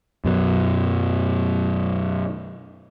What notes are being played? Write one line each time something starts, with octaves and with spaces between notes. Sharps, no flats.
F#2 B2 F#3